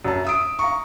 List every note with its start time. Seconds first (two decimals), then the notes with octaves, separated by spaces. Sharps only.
0.05 F#2 A5
0.25 E5 D#6 D7
0.59 F5 A#5 C#6